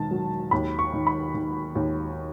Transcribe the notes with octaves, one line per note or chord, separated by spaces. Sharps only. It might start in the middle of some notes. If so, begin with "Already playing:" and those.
Already playing: E1 D#3 A5
F#3
D#2 B5
C#6
D#3
B5
D#3
D#2